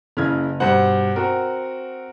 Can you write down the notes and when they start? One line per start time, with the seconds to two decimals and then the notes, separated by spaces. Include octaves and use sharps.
0.17 F#1 C#3 E4 F6 G#6
0.60 G2 B2 C5 F#5
1.16 C4 F#4 A#4